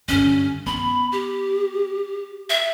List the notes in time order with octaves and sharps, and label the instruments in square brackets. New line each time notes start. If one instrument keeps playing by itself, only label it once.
[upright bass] G2 D3 [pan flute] C#4
[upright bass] B3 [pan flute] B5
[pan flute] G4
E5